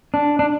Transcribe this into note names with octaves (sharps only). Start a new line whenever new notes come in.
D4
D4